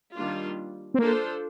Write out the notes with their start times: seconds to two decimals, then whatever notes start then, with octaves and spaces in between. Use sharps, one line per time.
0.15 D#3 G3 A#3 D4 F4
0.94 C4
0.99 A#3 D4 F4 A4 C5